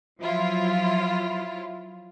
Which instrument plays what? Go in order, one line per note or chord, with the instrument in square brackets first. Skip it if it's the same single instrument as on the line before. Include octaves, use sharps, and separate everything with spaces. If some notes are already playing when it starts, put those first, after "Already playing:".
[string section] F3 F#3 E4 F4